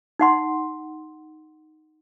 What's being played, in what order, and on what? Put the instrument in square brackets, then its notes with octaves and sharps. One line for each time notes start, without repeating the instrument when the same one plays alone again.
[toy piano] D#4 F#5 C6